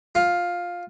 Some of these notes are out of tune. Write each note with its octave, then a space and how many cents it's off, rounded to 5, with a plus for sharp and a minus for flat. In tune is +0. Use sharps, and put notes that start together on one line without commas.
F4 +10